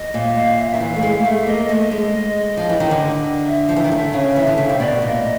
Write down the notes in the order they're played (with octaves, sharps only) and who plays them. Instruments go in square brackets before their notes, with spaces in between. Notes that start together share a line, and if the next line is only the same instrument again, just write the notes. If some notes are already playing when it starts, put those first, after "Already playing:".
Already playing: [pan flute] D#5
[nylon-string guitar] A#2
[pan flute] F5
E5
[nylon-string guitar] D#3 [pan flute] E5
[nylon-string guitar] E3 [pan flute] F5
[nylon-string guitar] A3
[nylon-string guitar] G#3 [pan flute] F5
[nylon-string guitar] A3 [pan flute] E5
[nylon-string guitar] A#3 [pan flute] D#5
[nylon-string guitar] A3 [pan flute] D#5
[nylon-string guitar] G#3
F3
E3
D#3
D3
[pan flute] E5
[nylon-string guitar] F3
E3
D#3
D3
C#3
[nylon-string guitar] E3 [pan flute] E5
[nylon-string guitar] D3
C#3
C3
[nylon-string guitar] B2 [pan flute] D5
[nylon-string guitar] A#2 [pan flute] D#5